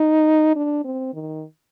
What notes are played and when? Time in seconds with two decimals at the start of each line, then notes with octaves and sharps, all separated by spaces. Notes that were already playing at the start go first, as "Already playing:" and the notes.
Already playing: D#4
0.56 D4
0.84 C4
1.14 D#3